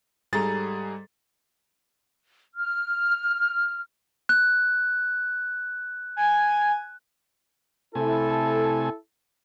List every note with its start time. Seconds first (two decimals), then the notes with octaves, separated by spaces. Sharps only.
0.33 G#2 G3 G#4 A4 A#5 A6
2.55 F6
4.29 F#6
6.16 G#5
7.95 C3 A3 E4 A4 G#5